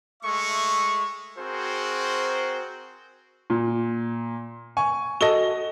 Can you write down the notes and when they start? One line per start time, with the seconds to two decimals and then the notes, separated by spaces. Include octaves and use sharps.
0.23 G#3 A3 E5 C#6
1.37 C4 F#4 G#4 A#4 C5
3.50 A#2
4.77 G#5 C#6
5.21 F#4 A4 D#5 A#6 G7